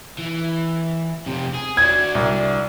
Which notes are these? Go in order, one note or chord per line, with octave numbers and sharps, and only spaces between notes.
E3
F2 C3
G#4
D4 F#4 G#6
C2